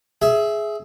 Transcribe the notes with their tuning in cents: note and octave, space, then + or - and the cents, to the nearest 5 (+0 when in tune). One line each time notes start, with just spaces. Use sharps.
G#4 +15 E5 +0